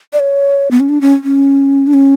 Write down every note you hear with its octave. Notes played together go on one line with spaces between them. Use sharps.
D5
C#5
B3
C#4
D4
C#4
C#4
D4
C#4